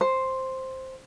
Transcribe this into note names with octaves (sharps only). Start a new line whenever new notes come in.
C5